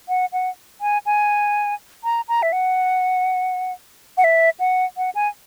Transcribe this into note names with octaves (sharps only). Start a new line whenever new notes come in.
F#5
F#5
G#5
G#5
A#5
A#5
E5
F#5
F#5
E5
F#5
F#5
G#5